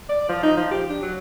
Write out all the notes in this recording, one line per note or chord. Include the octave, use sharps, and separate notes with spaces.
D5
F3
D#4
F3
G4
D4
F#3